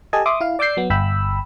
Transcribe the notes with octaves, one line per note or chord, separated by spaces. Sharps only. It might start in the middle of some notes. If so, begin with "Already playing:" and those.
G4 A4 D#5 G#5 A5
E5 C6 D6 D#6
E4 F5
D5 D6 E6 G6 C7
F#3 B3
G1 G5 B5 E6